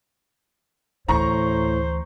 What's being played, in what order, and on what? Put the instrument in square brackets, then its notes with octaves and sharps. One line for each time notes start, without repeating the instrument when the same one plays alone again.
[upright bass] D2 E3 [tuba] A2 [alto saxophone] C5 [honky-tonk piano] A#5 C#6